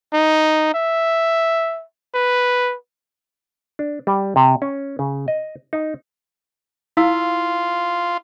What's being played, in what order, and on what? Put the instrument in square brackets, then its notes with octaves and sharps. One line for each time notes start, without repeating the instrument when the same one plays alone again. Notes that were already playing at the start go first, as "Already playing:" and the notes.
[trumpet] D#4
E5
B4
[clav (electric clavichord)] D4
G3
C3
C#4
C#3
D#5
D#4
[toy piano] E4 F5 E6 [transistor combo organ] F4